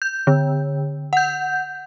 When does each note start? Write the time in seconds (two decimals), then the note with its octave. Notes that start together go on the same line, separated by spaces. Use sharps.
0.02 G6
0.27 D3
1.13 F#5 G6